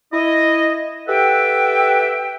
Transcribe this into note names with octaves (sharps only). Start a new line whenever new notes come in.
E4 D#5
G4 A4 B4 E5 F#5 G5